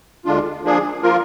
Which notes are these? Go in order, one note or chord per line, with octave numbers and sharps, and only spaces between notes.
D2 D3 G#3 D4 F4
F3 A#3 D4 G#4
F3 A#3 F4 A#4